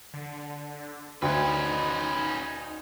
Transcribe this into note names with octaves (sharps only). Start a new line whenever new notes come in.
D3
D2 C#4 D#4 B4